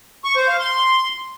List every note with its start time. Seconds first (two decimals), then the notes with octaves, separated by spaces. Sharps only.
0.24 C#6
0.36 C5
0.48 F5
0.60 C6